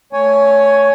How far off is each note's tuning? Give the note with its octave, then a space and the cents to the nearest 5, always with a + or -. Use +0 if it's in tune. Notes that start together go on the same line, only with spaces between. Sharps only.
A3 +0 C#5 +10 G#5 +5